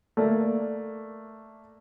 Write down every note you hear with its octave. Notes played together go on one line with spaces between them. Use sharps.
A3 A#3 D5